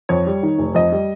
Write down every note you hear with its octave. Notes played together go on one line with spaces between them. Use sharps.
F2 C#5
G3
D#3
F1
F2 D#5
G3